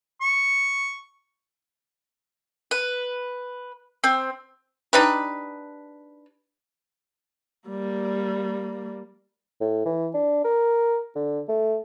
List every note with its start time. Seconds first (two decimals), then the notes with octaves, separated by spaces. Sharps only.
0.22 C#6
2.71 B4
4.04 C4
4.93 D4 D#4 G4 B4
7.69 G3 A#3
9.61 A2
9.85 E3
10.14 D4
10.44 A#4
11.16 D3
11.48 A3